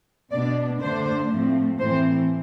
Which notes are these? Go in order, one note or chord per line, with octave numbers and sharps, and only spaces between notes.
B2 B3 D4 D5
D3 A3 D4 C5
A2 F3 A3 C4
A2 E3 A3 C4 C5